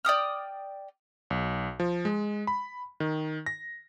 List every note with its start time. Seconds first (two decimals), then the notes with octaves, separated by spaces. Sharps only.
0.05 D5 G5 D#6 F6
1.30 B1
1.80 F3
2.05 G#3
2.47 B5
3.00 D#3
3.46 A#6